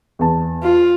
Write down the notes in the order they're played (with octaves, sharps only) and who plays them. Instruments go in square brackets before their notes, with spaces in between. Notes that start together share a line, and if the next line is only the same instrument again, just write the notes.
[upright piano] E2 A5
[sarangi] F4